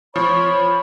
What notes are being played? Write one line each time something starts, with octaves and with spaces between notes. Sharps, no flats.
F3 C#5 B5